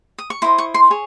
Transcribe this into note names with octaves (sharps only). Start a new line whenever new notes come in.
D#6
C#6
E4 C5 D#5 C6
C#6
C6
G#4 C#5